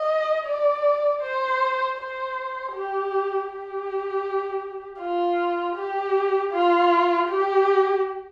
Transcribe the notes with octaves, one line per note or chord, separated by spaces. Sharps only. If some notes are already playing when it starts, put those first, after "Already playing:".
Already playing: D#5
D5
C5
C5
G4
G4
F4
G4
F4
G4